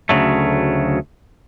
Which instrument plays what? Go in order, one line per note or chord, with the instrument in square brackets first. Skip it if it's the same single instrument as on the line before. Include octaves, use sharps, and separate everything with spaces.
[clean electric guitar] D2 C#3 F#3 A3